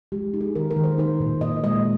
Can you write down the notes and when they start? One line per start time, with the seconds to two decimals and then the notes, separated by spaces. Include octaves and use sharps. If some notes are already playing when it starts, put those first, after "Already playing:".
0.12 G#3 G4
0.34 D#4
0.41 G#4
0.55 D#3 A#4
0.71 A#4
0.77 D#3
0.84 C5
0.98 D#4 C5
1.20 A#2
1.41 A#2 D#5
1.64 G#3 D#5